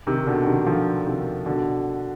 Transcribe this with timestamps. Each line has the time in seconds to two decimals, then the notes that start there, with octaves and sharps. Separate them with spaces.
0.07 C3 D#3
0.26 B2 D3
0.46 C3 D#3
0.66 D3 F3
1.06 C3 D#3
1.46 B2 D3